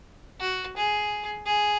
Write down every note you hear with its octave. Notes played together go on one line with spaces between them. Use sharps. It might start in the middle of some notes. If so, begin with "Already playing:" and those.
F#4
G#4
G#4